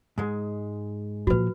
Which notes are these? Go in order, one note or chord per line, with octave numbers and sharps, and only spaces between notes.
G#2 G#3
A#2 F3 F#4 B4